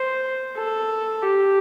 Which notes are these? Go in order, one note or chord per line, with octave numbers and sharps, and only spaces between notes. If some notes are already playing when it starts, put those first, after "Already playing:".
Already playing: C5
A4
G4